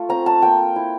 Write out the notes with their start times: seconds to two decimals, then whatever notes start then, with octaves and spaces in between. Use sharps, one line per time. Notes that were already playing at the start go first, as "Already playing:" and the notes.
Already playing: A3 F4
0.09 C4 A#5
0.26 A5
0.42 A#3 G5
0.76 E4